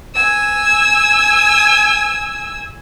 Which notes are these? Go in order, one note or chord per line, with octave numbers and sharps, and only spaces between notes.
G#5 E6